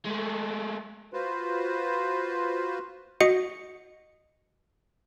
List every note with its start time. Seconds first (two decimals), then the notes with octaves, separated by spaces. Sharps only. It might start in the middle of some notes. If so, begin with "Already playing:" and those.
0.05 G#3 A3
1.13 F4 F#4 B4 C5
3.21 F#4 D#5 C#7